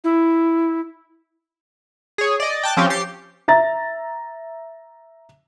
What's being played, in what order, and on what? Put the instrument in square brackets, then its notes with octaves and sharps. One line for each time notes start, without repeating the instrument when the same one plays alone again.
[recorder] E4
[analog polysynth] G#4 C#5
D5 D#5
G5 A5 F#6 A6
F3 C4 C#4 G4
G4 A6 C7 C#7
[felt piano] E5 A#5 A6